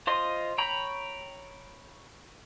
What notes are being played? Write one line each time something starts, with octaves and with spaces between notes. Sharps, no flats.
F4 C5 D#5 C6
C#5 G5 A#5 B5